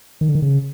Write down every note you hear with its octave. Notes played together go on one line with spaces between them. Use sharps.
D#3
D3
D#3
C#3